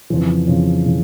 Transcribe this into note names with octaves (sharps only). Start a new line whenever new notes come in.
F2 C#3 E3
F2 C#3 E3
C#3 E3